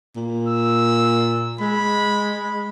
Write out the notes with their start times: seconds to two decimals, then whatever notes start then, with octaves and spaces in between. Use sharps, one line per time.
0.16 A#2
0.48 E6
1.60 G#3 B5